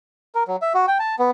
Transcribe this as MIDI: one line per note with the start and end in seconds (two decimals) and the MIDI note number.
0.35 0.43 70
0.48 0.56 54
0.62 0.73 76
0.74 0.86 66
0.88 0.98 79
0.99 1.15 81
1.19 1.31 59